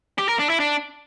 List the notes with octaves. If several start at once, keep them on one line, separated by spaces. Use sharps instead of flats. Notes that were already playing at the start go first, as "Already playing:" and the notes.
G4
A#4
D4
E4
D4